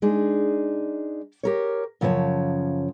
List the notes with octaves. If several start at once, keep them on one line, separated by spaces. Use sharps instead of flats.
G#3 D4 D#4 G#4
G4 A#4 C#5
F#2 C#3 F3 A#4 C#5 A5